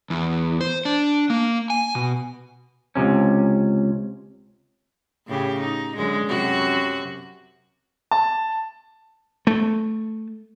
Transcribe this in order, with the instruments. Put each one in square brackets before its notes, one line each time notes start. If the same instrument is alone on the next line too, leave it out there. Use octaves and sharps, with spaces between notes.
[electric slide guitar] E2
C5
D4
A#3
G#5
B2
[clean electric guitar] C#2 G#2 C3 C#4
[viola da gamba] A2 C#3 G4
D#4
F#2 D3 G#3
F#2 C3 F#4
[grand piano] A5
[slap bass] A3